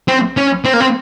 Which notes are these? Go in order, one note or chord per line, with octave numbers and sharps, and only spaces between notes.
C4
C#4
C4
A#3
C4